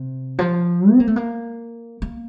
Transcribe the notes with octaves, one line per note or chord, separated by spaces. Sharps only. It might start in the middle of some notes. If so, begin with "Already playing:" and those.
Already playing: C3
F3
C4
A#3
A3
A#3
A#3